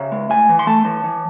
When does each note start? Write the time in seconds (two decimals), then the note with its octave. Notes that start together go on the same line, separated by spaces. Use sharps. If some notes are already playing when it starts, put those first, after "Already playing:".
Already playing: C#3 E5
0.12 G#3
0.30 A2 G#5
0.49 E3
0.59 C6
0.67 A3 A5
0.85 E3
1.04 E3